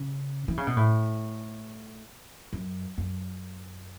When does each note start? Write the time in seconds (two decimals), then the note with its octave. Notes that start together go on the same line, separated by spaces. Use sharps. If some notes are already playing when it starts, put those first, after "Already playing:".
Already playing: C#3
0.48 E3
0.57 C#3
0.67 B2
0.77 A2
2.53 F#2
2.98 F#2